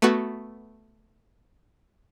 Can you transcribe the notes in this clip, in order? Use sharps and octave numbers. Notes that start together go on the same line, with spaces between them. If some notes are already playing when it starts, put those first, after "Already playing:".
A3 B3 F#4